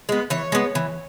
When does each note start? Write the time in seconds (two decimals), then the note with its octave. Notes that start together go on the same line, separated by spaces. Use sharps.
0.09 G#3 B3
0.30 E3 C#5
0.52 G#3 B3
0.75 E3